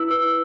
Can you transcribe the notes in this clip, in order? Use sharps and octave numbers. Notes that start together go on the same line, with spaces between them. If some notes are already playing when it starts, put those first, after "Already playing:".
Already playing: E4 B4 E6
B4 E6